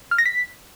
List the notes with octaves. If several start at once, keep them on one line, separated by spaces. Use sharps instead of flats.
F6
A#6
B6